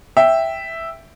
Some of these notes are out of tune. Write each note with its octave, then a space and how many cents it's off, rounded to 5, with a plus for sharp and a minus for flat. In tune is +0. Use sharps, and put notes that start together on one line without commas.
E5 +0 G5 +0